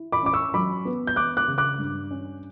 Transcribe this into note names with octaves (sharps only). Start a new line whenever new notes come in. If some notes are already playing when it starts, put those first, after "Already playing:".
Already playing: E4
B5 D6
C#4 D6
C#6 E6
F#3 B5 D6
B3
G6
B3 D6 F#6
D6 F#6
C#3
D6 F#6
G2
C#4